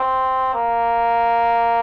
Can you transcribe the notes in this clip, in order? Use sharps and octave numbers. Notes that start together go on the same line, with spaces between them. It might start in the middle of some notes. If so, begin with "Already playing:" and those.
Already playing: C4
A#3